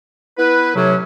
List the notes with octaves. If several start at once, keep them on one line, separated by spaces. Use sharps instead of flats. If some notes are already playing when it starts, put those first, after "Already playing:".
B3 E4 B4
A2 C3 F#3 C#4